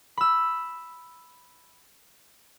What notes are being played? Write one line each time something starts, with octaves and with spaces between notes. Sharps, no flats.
B5 E6